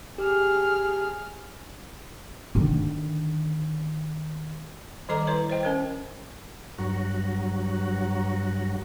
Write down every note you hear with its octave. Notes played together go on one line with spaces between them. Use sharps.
G4 G#4 F6
D3 D#3
D#3 G3 A4 D#5 A#5 D6
E4 B4 C#5 A#5
C5 C#5 D#5 G5
C#4 A#4 C#5
G2 F#3 F#4